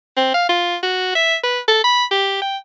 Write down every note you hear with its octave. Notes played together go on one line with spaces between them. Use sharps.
C4
F5
F4
F#4
E5
B4
A4
B5
G4
G5